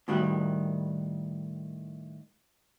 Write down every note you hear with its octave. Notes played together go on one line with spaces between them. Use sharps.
A2 D#3 G3 F#4